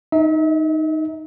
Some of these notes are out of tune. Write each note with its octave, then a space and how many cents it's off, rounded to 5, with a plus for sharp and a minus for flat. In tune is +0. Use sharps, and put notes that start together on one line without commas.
D#4 +0 E5 -40